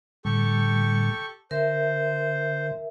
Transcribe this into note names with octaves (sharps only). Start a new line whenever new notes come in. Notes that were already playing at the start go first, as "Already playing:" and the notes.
A2 D3 G3 G4 A4 C#6
D3 A#4 C5 E5